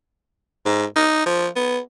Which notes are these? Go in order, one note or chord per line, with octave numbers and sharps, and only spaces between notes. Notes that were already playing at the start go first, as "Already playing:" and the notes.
G#2
D#4
F3
B3